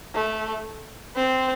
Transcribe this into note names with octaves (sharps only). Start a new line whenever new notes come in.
A3
C4